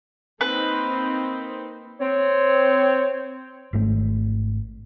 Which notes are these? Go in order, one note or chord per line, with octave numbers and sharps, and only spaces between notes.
A#3 C4 D#4 B4
C4 C#5
G#1 G#2 A3